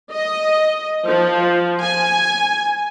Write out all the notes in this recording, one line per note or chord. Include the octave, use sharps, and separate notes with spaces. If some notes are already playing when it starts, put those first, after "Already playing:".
D#5
F3
G#5